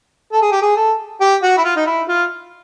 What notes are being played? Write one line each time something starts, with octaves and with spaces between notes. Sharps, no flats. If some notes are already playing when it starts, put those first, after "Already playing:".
A4
G#4
G4
G#4
A4
G4
F#4
E4
F4
D#4
E4
F4